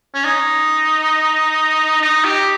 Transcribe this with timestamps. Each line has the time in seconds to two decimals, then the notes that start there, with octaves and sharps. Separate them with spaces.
0.15 C#4
0.25 D#4
2.02 D#4
2.24 G4